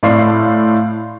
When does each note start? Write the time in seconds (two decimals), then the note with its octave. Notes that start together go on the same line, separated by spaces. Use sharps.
0.03 A2 D5 F5 C6 C7